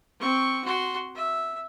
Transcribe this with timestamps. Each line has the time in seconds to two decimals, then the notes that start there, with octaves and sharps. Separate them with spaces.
0.20 C4 C#6
0.64 F#4 C6
1.15 E5